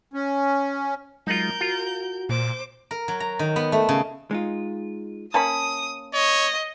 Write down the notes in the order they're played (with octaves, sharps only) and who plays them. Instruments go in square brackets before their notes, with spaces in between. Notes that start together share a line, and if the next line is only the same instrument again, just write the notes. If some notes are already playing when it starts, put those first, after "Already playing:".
[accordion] C#4
[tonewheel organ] F#3 G#3 [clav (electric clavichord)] D#4 F4 [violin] A#4 G6
[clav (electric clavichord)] F4 [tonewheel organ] F#4
[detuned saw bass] A#2 [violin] C5 D6
[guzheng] A#4
F#3
A#5
D#3
B3
A3
C#3
[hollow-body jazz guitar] G#3 D#4 F4
[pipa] A#3 C#4 B5 [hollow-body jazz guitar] A5 [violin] D#6
[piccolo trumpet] C#5 [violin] D#5